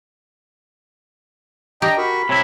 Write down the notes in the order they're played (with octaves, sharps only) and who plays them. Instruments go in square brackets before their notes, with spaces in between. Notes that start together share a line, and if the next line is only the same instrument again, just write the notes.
[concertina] D4 [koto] G4 [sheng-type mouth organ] D#5 G5 A#5
[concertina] F#4 A#4 C#6 [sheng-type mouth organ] B5
[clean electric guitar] C3 E4 [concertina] C#5